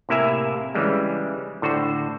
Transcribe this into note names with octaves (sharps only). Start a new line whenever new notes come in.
A2 C3 A#3 E4 E5 G#5
C#3 E3 G3 G#3
A2 D3 F#4 C5